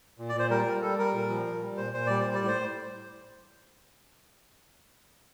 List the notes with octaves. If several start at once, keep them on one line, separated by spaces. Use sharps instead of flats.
A#2
D5
A#2 C5
G3 A#4
G3
G3 A4
G3 A#4
A#2
F3
A#2
G3
A#2 C5
A#2 C5
G3 D5
G3 C5
D5
A2
C5